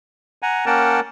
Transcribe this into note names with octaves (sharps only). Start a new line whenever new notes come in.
F#5 G#5 A#5
A#3 C#4 A#4 F#5 G5 A5